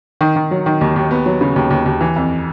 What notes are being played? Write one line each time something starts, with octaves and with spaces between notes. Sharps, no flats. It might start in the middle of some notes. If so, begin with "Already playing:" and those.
D#3
D#3
F#3
D#3
D#2
D#2
B3
F#3
C#3
D#2
D#2
D#2
E3
F2